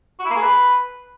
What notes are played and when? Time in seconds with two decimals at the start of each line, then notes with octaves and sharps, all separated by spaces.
0.20 F#4
0.25 E4
0.31 A#3
0.36 G#4
0.42 B4